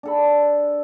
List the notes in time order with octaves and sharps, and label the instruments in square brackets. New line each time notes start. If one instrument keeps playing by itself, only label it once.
[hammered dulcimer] D4 A4 B5